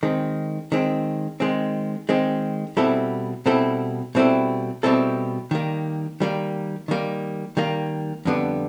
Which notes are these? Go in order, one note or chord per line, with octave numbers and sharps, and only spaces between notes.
D#3 G#3 C4
D#3 G#3 C4
D#3 G#3 C4
D#3 G#3 C4
B2 G3 C4 E4 A4
B2 G3 C4 E4 A4
B2 G3 C4 E4 A4
B2 G3 C4 E4 A4
D#3 G3 A#3
D#3 G3 A#3
D#3 G3 A#3
D#3 G3 A#3
F2 D3 G3 B3